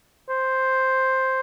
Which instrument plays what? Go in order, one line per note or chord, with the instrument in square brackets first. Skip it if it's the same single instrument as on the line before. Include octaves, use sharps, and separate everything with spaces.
[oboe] C5